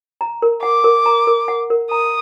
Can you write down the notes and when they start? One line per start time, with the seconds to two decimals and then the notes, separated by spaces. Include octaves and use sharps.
0.21 A#5
0.42 A#4
0.63 F#5 D6
0.84 A#4
1.06 A#5
1.27 A#4
1.48 F#5
1.70 A#4
1.91 A#5 D#6